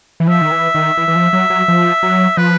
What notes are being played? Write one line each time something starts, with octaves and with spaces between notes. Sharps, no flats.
E3
F3 E5
D#3
E3
D#3
E3
E3
F3
F#3
F#3
F3
F#3
F3 B4